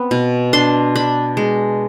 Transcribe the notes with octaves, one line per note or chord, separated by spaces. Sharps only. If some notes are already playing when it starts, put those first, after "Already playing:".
Already playing: B3 C4
B2
D4 C6
D4 B5
G#3